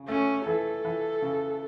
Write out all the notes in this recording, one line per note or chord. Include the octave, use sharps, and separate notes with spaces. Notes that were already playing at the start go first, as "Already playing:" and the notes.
Already playing: C#3
A3 C#4
E3 A4
E3
C#3